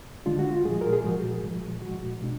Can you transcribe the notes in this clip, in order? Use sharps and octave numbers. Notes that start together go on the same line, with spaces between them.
D3 G#3 D4 F4
F#4
F4
A#2 F3 G#3 G#4
A#4
G#4
A#2 F3 G#3 F#4
A#2 F3 G#3
A#2 F3 G#3 F#4
B2 G#3 D4